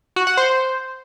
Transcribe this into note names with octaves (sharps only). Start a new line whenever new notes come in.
F#4
F#5
C5